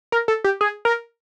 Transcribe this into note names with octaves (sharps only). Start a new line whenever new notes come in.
A#4
A4
G4
G#4
A#4